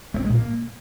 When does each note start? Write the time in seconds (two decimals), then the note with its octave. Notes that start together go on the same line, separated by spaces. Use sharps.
0.14 A3
0.20 C4
0.25 G#3
0.30 A#2
0.35 A#3